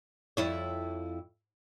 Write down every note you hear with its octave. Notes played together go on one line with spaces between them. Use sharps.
F2 E4 C#5